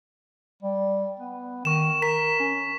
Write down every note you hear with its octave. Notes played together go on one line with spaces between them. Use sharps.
G3
B3
D#3 C#6 E7
A#4 B6 E7
C#4